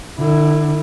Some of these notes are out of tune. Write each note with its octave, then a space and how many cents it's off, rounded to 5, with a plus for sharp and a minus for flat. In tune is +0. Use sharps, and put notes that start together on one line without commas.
D3 +45 E4 +0